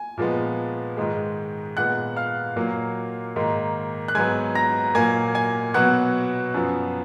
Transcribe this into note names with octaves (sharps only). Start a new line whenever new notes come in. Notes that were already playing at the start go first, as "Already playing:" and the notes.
Already playing: G#5
A#2 F3 G#3 B3
G#2 D#3 G#3
A#2 G#3 B3 F#5 F#6
F5 F6
A#2 F#3 A#3
G#2 D#3 A#3
F#6
G#2 F#3 B3 G#5 G#6
A#5 A#6
A#2 F#3 A#3 G#5 G#6
G#5 G#6
B2 F#3 B3 F#5 F#6
F#2 F3 B3